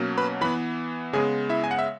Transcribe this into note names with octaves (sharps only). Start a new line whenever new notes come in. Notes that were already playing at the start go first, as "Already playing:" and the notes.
Already playing: B2 F#3 A#3 C#4
B4 B5
E3 B3 B4 B5
C#3 G#3 B3 G#4 G#5
E4 E5
G#5
F#5
E5